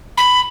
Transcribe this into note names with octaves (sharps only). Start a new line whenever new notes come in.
B5